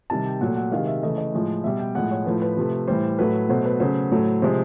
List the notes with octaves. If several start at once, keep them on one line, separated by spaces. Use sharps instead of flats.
C3 D#3 G3 A5
G5
A#2 F#3 A3 F#5
F#5
C3 D#3 G#3 F5
E5
C#3 E3 A3 D#5
D#5
A2 F3 G#3
B2 G3 E5
G5
A2 F3 G#3 F#5
C#5
A2 F3 A3 B4
B4
C3 F3 A3
A2 E3 G3 C5
A2 F#3 A3 B4
B2 F#3 A3 C5
B4
C#3 F#3 A3 C5
A2 F#3 A3
C3 F3 G#3 C5